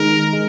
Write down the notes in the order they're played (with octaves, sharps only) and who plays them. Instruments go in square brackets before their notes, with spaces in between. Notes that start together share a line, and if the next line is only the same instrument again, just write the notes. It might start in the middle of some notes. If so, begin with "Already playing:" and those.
Already playing: [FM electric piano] D#3 G#3 D#4 [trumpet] A#4
[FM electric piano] G#3